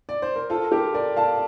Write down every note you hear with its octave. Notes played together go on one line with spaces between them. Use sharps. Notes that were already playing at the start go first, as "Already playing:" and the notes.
D5
C5
A#4
F4 A4
G4 A#4
A#4 D5
F5 A5